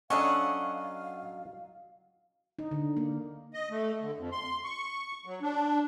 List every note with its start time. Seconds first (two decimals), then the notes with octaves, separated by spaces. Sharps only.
0.10 F#3 C#4 D4 A4 D#5 F5 F#5 C#6
2.59 D#4
2.71 D3
2.97 A#3
3.54 D#5
3.70 A3
4.01 D3
4.18 F2
4.32 C6
4.64 C#6
5.25 F#3
5.42 D4